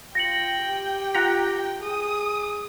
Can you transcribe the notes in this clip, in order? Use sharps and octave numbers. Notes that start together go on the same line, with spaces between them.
F4 G5 A#6 C#7 F#7
G4
F4 F#5 A#5
G#4 D#6